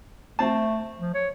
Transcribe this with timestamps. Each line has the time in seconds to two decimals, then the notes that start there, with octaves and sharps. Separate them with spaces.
0.39 A3 C4 A5
1.00 F3
1.14 C#5